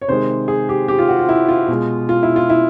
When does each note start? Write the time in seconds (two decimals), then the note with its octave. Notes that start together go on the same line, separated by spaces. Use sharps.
0.02 C#5
0.08 C3 D#3 G#3 C5
0.48 G#4
0.69 G4
0.88 G4
0.99 F4
1.09 F#4
1.19 F4
1.29 E4
1.48 F4
1.68 B2 G#3
2.09 F4
2.23 E4
2.36 F4
2.49 E4